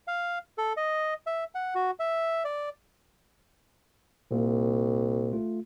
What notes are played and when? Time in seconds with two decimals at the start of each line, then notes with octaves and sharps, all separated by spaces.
0.07 F5
0.58 A4
0.77 D#5
1.27 E5
1.55 F#5
1.75 F#4
2.00 E5
2.45 D5
4.31 C2 A#2 A#3
5.33 A3 F4